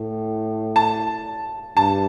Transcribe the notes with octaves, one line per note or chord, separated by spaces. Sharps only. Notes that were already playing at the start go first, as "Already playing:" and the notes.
Already playing: A2
A5
G2 A5